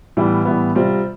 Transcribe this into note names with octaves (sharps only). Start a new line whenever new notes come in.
A2 E3 G3 B3
A2 E3 G3 B3
C3 G3 C4 F4